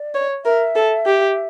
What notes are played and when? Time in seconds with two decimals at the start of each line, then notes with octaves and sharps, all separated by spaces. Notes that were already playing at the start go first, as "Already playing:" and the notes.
Already playing: D5
0.14 C#5
0.45 A#4 E5
0.75 A4
1.06 G4